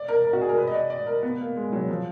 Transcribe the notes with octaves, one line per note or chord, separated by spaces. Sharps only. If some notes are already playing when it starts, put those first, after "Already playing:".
Already playing: D5
A#4
A#4
F#4
G#4
A#4
B4
D#5
D5
D5
A#4
B3
A#3
G#3
F#3
F3